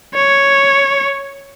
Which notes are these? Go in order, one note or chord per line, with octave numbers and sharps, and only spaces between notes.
C#5